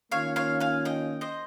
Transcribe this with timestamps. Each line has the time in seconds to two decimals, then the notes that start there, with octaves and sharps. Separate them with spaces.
0.12 D#3 A#3 C#4 F4 C#5 F5
0.36 C#5 F5
0.60 F5 G#5
0.85 D#5 G5
1.21 C5 D#5